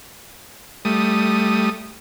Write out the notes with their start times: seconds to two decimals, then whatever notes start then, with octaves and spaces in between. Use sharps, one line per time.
0.85 G3 A3 D#6